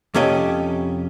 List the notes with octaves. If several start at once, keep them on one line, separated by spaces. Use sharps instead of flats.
F2 C3 C#4 G4 A4 D#5